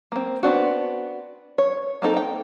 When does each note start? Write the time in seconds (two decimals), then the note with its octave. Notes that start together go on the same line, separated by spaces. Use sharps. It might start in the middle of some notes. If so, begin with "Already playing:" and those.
0.12 A#3 C4
0.43 B3 C4 D4 F#4
1.58 C#5
2.02 A#3 C4 D#4 A4
2.17 G5